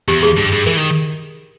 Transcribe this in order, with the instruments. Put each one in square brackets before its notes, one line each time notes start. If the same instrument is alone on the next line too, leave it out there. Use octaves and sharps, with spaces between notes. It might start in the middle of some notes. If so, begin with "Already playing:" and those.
[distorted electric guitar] E2 [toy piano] G4
[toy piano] G#4
[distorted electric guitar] G2
G2
[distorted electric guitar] E3 [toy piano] A#4
[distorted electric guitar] D#3